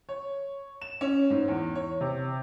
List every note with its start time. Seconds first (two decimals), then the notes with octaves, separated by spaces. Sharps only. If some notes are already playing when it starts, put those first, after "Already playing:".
0.09 C#5
0.82 E7
1.01 C#4
1.30 G#2
1.48 E2
1.75 C#5
2.01 C3